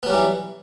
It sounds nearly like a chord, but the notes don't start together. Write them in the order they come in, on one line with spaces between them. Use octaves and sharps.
B3 F#3 G3 E3